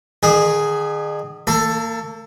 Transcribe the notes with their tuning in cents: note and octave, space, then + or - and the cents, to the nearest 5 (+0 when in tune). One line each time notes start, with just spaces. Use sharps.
D#3 -45 G#4 +0
A#3 -35 A4 +10